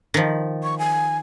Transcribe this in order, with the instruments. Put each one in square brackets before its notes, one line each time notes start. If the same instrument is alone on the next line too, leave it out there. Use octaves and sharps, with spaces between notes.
[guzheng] D#3 F3
[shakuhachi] C#6
G#5